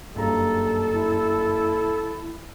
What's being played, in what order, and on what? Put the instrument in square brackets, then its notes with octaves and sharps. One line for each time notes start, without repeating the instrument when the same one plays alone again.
[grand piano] F#1 G2 A#5 [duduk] A4
[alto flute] E4